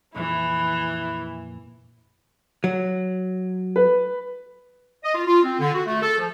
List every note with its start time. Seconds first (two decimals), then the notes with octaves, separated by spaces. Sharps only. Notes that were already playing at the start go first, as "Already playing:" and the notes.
0.16 F2 A#2 E3 E4
2.64 F#3
3.76 B4
5.04 D#5
5.15 F4
5.27 F4
5.43 C4
5.60 D3
5.75 F#4
5.87 A3
6.02 A4
6.18 F3